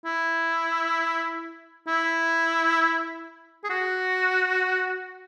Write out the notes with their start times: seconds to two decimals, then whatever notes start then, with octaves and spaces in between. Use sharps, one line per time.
0.05 E4
1.87 E4
3.64 G#4
3.70 F#4